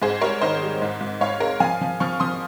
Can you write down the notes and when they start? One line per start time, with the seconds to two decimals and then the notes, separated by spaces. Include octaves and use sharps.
0.02 G#2 G#4 C5
0.21 G3 A#4 C#5
0.41 D#3 C5 D#5
0.62 G3
0.82 G#2
1.01 G#2
1.21 G#2 C#5 F5
1.40 G#3 A#4
1.60 F3 F5 G#5
1.81 F3
2.00 F3 C#6 F6
2.20 F3 C6 D#6